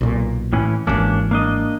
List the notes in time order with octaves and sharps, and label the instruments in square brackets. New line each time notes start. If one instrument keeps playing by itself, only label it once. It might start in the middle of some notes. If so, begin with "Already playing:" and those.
[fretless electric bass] B1 A#2
[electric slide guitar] A2 E3 C#4
[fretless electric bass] G#1 G2 E3 [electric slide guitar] A#3 C#4 D4
[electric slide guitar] A#3 D4 D#5